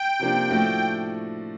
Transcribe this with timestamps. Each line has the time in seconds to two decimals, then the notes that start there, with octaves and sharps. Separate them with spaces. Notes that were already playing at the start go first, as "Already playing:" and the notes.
Already playing: G5
0.20 C3 F3 A#3 D4
0.50 A2 F3 A3 D4 F#4